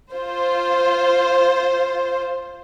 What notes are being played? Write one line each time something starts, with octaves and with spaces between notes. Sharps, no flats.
F4 C5